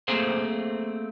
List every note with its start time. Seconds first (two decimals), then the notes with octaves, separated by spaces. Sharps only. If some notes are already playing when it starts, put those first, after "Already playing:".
0.08 A3 A#3 C4 G#4 C5